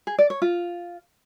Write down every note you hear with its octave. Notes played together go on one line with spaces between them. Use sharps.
G#4
D5
C#5
F4